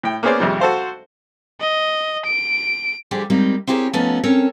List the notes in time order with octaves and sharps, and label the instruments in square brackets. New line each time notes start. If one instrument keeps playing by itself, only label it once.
[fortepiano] A2 G5
A#3 B3 C#4 G#4 C5 D5
G#1 F2 C3 G3
F#4 A4 C5 F5
[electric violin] D#5
D7
[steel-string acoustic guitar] D3 F3 G3 G4 G#4
G3 G#3 A#3 C4 D#4
C4 E4 G4 G#4 A#4 C#5
F3 A3 B3 C#4 D#4 F4
C4 C#4 A4 A#4 C#5